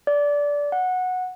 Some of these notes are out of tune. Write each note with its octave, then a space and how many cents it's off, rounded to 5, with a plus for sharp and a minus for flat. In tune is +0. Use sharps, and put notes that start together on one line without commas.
D5 -15
F#5 -10